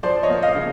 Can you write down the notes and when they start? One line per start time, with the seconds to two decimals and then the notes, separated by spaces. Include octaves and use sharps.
0.03 F3 C5 D5
0.23 C#5 D#5
0.30 A#3
0.42 D#5 F5
0.56 C#3